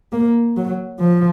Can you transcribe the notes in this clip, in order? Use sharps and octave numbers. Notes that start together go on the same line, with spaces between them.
A#3
F#3
F3